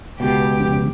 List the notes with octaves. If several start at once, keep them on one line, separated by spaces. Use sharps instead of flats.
C#2 B2 G4
F2 C#3